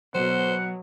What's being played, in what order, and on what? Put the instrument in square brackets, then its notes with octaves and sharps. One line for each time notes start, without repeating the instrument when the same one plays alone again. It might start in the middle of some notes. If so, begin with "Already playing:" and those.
[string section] B2 [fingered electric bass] F#3 [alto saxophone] C5 [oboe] F#5